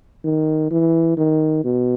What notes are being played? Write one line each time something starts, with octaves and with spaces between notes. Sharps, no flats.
D#3
E3
D#3
B2